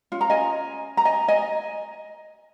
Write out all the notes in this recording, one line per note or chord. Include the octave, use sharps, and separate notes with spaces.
C#4 F4
A#5
D#5 G#5
A#5
D#5 G#5
D#5 G#5